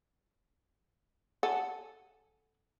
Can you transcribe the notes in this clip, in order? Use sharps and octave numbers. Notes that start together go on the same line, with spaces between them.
A4 F#5 G#5